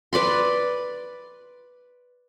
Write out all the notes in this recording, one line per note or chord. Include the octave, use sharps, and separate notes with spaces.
B4 D5 B5 C6